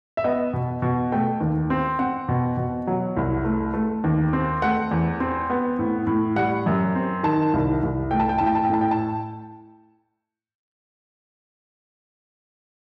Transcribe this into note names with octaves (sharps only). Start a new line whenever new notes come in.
E5
B3 D#5
B2
B2
A3 G5
D#2
C4
C4 F#5
B2
B2
F#3
C2
A3
A3
D#2
C4
A3 F#5
E2
C4
B3
A2
A2
G3 F#5
F#2
C4
D#3 A5
C2
C2
A3 G5
A5
G5
A2 A5
G5
A5
G5
A2 A5
G5
A5